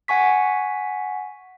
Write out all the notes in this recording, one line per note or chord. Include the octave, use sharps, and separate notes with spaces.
F#5 G#5 C#6 B6